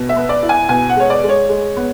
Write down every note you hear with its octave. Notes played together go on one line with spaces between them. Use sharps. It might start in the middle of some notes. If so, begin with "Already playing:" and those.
Already playing: B2
E5
B3
D5
E4
G#5
B2 G#5
F#5
G#3 C#5
D5
G#3
C#5
G#3
B3